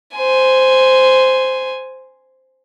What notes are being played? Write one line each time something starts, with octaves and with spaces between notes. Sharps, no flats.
C5 G#5